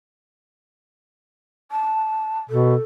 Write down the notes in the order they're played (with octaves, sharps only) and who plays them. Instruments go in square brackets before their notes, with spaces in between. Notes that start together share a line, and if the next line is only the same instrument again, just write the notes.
[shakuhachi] A5
[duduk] B2 [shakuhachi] A4